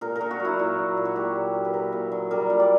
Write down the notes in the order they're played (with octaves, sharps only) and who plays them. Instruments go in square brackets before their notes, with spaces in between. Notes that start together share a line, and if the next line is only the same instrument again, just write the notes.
[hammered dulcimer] A#2 A#4
A#4
A#2
F#4
F#3
E4
A#2
F#3
A#2
F#4
A#2 G4
F#3
F#3
B4
A#2 A#4
A#2
F#3
G3 A#4
A#2
D5